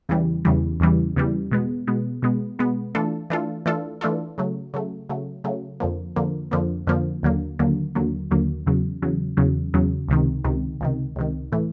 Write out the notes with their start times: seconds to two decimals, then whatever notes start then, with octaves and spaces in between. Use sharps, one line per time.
0.09 E2 C#3 E3 G3
0.45 E2 C#3 E3 G3
0.80 E2 C#3 E3 G3
1.16 E2 C#3 E3 G3
1.51 B2 G#3 B3
1.87 B2 G#3 B3
2.22 B2 G#3 B3
2.59 B2 G#3 B3
2.95 E3 A3 D4 F4 A4
3.30 E3 A3 D4 F4 A4
3.66 E3 A3 D4 F4 A4
4.01 E3 A3 D4 F4 A4
4.38 C#3 F#3 A3
4.74 C#3 F#3 A3
5.09 C#3 F#3 A3
5.44 C#3 F#3 A3
5.80 F2 D3 F3 A#3
6.16 F2 D3 F3 A#3
6.51 F2 D3 F3 A#3
6.87 F2 D3 F3 A#3
7.23 D#2 D3 F#3 A#3
7.59 D#2 D3 F#3 A#3
7.95 D#2 D3 F#3 A#3
8.31 D#2 D3 F#3 A#3
8.66 E2 C#3 F#3
9.02 E2 C#3 F#3
9.37 E2 C#3 F#3
9.74 E2 C#3 F#3
10.08 C#2 C3 D#3
10.44 C#2 C3 D#3
10.81 C#2 C3 D#3
11.16 C#2 C3 D#3
11.52 A2 E3 A3